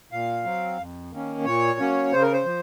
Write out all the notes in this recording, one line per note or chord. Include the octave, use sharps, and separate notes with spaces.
A#2 F5
F#3 C4
F2
D#3 A#3 C#4
A#2 C#5
F#3 A#3 C#4
C#3 C5
A#4
C5
F3